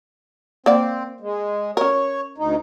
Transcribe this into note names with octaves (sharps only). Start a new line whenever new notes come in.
A#3 C4 D5 F#5
G#3
C#4 A#4 C#5
D2 D#4